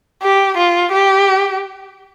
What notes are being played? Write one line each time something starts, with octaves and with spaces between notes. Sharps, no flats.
G4
F4
G4